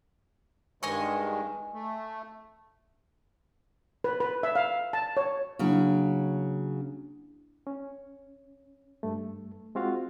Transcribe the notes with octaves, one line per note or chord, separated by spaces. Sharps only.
G2 D#3 G#3 D#5 G#5 C#6
A3
B4
B4
E5
F5
A5
C#5
C#3 F#3 A#3 D4 E4
C#4
G2 A3
G#3 C4 F4 F#4 F5